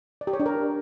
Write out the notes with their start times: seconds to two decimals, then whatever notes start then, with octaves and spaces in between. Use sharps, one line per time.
0.21 D5
0.27 G4
0.33 C#5
0.40 D4
0.46 A#4